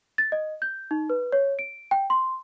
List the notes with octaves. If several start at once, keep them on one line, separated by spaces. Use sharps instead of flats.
A6
D#5
G6
D#4
B4
C#5
D7
G5
C6